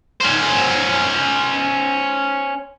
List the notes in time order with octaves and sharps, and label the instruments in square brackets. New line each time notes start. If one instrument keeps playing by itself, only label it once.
[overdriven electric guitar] C#4 C5